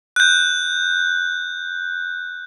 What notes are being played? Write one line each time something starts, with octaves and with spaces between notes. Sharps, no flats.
F#6 G6